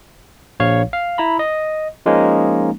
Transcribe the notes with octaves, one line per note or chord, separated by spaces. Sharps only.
A#1 C#5 F5
F5
E4 A#5 B5
D#5
F3 G#3 A#3 C#4 D#4